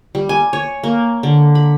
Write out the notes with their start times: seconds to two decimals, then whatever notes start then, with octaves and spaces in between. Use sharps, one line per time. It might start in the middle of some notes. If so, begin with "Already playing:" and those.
0.15 G3
0.29 G#5
0.53 C#5
0.83 A#3
1.23 D3
1.55 B5